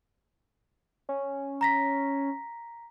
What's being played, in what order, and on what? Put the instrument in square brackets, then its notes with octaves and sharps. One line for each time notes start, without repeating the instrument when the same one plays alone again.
[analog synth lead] C#4
[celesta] A#5 A#6 B6